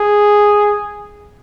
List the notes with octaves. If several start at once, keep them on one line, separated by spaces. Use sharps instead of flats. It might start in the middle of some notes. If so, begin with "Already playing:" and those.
Already playing: G#4